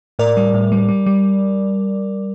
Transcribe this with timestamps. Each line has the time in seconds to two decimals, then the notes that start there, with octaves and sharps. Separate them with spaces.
0.19 A2 A#4 D5
0.37 G3
0.54 A2
0.72 G3
0.89 G3
1.06 G3